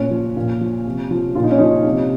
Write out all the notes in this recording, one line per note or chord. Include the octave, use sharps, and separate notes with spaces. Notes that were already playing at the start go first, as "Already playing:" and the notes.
Already playing: A#2 C#4
F3
A#2
F3
C3
F3
A#2 F4
D#4
C#4
F3 D#4
C3